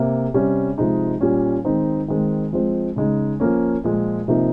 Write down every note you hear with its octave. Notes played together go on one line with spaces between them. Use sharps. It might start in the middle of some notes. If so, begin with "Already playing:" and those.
Already playing: C3 A#3
C3 G3 C#4
C3 F3 G#3 D#4
A#2 G3 C#4
D#3 G#3 C4 D#4
D#3 G#3 C4
F3 G#3 C4
C#3 G#3 D#4
F3 A#3 C#4
A#2 F3 G#3
C3 F3 A#3 D#4